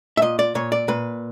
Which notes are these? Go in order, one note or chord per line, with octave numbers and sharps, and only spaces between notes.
E5
A#2 D#5
D5
A#2 C#5
D5
A#2 B4